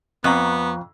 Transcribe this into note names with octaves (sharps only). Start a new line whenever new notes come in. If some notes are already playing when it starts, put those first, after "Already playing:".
F2 B3 A#5 C#6 F#6